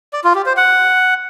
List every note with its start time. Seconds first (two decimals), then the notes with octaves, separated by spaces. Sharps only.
0.13 D5
0.24 F4
0.35 G4
0.46 C5
0.57 F#5